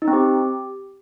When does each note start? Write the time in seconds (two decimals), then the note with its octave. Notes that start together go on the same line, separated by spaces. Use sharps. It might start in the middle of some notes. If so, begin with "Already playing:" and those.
0.02 D#4
0.08 C4
0.13 G4